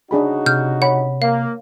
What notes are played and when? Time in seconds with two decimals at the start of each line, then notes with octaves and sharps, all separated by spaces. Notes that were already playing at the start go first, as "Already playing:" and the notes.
0.11 C#3 D4 D#4 F#4 G#4 B5
0.46 C3 F6 G6
0.82 C#5 F#5 B5
1.22 A#3 F5